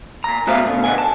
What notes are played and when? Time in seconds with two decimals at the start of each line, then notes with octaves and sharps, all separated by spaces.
0.24 A#2 A#5
0.47 A3 B3 F#4 C5 E5 F5
0.65 B2 D3
0.84 B4 D#5 F5 F#5 G#5
0.98 A5